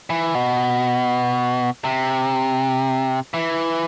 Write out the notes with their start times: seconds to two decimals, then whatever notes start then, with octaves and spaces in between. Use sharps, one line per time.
0.10 E3
0.35 B2
1.84 C3
3.34 E3